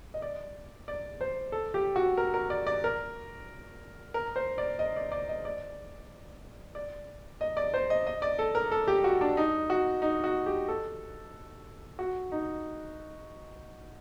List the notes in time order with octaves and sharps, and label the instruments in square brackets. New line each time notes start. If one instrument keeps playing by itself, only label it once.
[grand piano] D#5
D5
D5
C5
A4
G4
F#4
A#4
A#4
D5
D5
A#4
A#4
C5
D5
D#5
D5
D5
D#5
D5
D5
D#5
D5
C5
D#5
D#5
D5
A4
A#4
A4
G4
F#4
D4
D#4
F#4
D#4
F#4
G4
A4
F#4
D#4